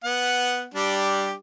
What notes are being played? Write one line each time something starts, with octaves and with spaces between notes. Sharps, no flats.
B3 F#5
G3 D4 G4